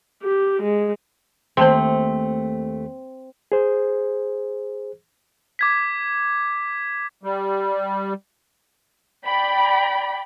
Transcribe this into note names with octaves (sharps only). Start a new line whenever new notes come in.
G4
G#3
D#2 A3 C4 C5 A5 C6
G#4 C5
D6 G#6 B6
G3
D5 G5 B5